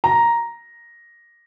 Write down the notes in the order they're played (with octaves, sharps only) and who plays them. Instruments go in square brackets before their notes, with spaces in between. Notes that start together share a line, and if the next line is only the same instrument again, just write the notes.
[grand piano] A#5